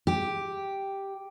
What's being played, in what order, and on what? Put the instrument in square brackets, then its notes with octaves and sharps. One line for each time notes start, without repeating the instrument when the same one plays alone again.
[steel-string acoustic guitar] G4